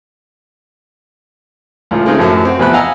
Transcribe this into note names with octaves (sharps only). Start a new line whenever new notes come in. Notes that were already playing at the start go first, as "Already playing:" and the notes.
C#2 A2 F4
G#3 A3 C4 C#4 D#4 F4
F#2 A2 F3 F#3
C4 F#4
E2 C3 F3 B3 B5 F#6
D#5 F5 F#5 G#5 A#5 E6